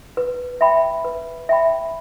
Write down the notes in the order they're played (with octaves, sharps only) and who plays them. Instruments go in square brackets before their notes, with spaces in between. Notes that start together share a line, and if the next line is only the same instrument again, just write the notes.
[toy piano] B4
E5 G5 B5
B4
E5 G5 B5